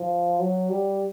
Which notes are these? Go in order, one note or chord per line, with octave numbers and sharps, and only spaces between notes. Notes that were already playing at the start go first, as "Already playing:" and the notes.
Already playing: F3
F#3
G3